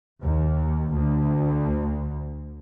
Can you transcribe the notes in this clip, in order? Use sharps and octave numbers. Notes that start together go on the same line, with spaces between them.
D#2
D2